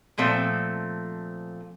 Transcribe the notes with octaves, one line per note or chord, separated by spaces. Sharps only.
A#2 F3 A3 C4